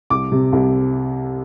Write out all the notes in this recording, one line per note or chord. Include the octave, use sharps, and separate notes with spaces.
C2 D6
C3
C2